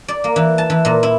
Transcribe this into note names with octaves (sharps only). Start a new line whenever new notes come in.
D5
A#3
E3
A5
E3
A#2
E4